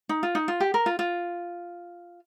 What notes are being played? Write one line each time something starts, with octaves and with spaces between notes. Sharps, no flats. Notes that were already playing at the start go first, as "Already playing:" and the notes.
D#4
F4
D#4
F4
G4
A#4
F4
F4